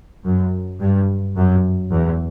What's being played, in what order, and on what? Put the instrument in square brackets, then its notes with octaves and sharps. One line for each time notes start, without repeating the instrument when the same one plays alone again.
[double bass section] F#2
G2
F#2
E2